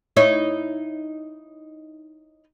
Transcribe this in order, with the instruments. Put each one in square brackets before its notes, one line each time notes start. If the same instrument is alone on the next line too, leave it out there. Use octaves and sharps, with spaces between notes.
[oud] D#4 E4 C#5